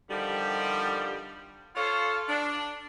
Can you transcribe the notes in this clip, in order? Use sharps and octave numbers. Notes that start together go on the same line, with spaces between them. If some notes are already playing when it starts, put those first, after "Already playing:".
D3 D#3 F3 G3
F4 A4 C5 C#5 F5
D4